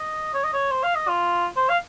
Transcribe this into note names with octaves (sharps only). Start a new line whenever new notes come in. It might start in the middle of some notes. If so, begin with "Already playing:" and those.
Already playing: D#5
C#5
D#5
C#5
C5
F5
D#5
F4
C5
F5